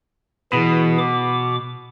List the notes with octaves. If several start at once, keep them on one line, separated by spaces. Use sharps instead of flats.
B2 E3 E4 G#4
D6